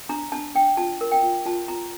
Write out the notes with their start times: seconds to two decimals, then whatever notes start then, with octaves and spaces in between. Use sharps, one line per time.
0.09 D4 A#5
0.32 D4 A5
0.55 D4 G5
0.77 F4 A5
1.01 A#4
1.12 G5
1.23 F4
1.46 F4 A5
1.68 F4 A#5